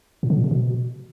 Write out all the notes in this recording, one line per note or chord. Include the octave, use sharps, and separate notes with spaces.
A#2
D3
A#2
C3
B2